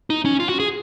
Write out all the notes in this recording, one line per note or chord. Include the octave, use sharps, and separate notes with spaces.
D#4
C#4
F4
F#4
G#4